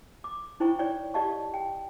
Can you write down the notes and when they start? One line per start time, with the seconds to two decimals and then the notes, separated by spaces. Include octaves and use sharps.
0.24 D6
0.60 D#4 E4 C5 G5 A#5 C#6
0.79 C#5 D5 G5
1.14 G4 D5 D#5 F5 A5 C#6
1.54 G5